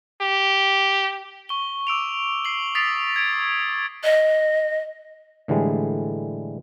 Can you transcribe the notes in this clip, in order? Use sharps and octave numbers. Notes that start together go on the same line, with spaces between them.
G4
C#6 G7
D6 E6 D7 F7
C7 F#7
D#6 A6 B6 C7 D7 F7
G#6 D7
D#5
A2 D3 E3 G3 G#3